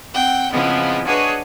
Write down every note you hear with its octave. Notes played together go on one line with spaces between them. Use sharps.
C4 F#5 G5
C#3 E3 F3 G#3 B3 C4
D4 F#4 G#4 B4 C#5 D#5